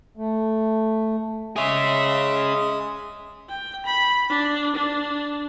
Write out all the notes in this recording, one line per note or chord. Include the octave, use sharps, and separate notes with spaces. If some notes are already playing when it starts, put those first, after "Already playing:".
A3
G#3 G#4 C#5 E5 D#6
G5
B5
D4
D4